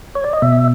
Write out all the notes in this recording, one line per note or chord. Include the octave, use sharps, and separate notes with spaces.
C#5
D5
D#5
B2 E5